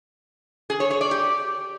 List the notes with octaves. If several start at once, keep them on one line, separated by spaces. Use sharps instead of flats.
G#4
C#5
C#5
D5
G4